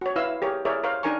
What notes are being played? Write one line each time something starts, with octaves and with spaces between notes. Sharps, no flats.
F#4 C#5
E4 B4 F5 E6
G4 G#4 A#4 C#5
E4 G#4 A#4 C#5 D5 E5
A#4 C5 C#5 F5
D4 D#4 A#4 G#5 A#5 C#6